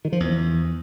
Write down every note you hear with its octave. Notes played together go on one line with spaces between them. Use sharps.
D#3
F3
E2